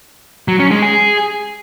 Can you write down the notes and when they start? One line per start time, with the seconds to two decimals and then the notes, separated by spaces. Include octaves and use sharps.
0.48 F#3
0.60 C#4
0.71 G#3
0.82 G#4